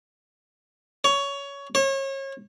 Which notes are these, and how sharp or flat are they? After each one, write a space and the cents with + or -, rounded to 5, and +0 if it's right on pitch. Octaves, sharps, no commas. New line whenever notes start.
C#5 +15
C#5 -35